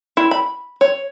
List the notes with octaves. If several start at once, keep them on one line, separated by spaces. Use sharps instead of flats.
E4
B5
C#5